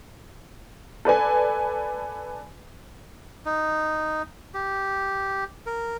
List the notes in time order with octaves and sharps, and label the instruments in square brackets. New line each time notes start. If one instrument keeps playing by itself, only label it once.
[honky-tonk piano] A4 B4 D5 G#5
[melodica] D#4
G4
A#4